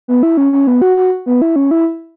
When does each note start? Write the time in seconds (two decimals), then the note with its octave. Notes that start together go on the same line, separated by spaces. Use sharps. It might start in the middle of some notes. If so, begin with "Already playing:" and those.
0.08 B3
0.23 E4
0.37 C#4
0.53 C#4
0.67 B3
0.82 F#4
0.97 F#4
1.26 B3
1.42 E4
1.56 C#4
1.71 E4